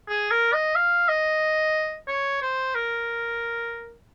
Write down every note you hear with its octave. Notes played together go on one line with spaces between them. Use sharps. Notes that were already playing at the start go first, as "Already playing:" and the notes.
G#4
A#4
D#5
F5
D#5
C#5
C5
A#4